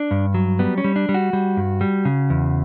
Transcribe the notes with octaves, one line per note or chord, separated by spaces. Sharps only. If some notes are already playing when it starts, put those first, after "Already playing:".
Already playing: D4
G2
F#3
G3 B3
C#4
G3
D4
G3
F#4
G3
G2
G3
C#3
E2